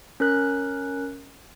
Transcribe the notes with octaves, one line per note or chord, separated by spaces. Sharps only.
C#4 A#4 F#6